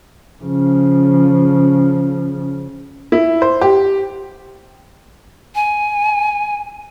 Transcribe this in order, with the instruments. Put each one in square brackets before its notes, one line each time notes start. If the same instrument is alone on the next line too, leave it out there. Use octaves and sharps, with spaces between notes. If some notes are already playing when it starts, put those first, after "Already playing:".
[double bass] C#3 F3
[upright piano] E4
C5
G4
[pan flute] G#5